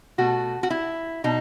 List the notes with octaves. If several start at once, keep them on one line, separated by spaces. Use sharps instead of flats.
B2 A3 F#4
F#4
E4
B2 D#4